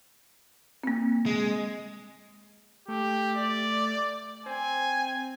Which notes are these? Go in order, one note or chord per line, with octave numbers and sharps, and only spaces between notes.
A#3 C4
G#3
A3 G4
D5
C4 G#5